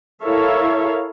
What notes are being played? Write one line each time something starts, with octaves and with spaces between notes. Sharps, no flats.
E4 A4 A#4 C#5 E5 F5